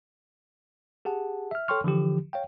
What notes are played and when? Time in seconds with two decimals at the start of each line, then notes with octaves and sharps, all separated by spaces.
1.05 G4 G#4 F#5 A5
1.51 E5 F6
1.68 A4 C#5 G5 C6 C#6 F6
1.84 D3 E3 F3 G4
2.33 C#5 F5 G5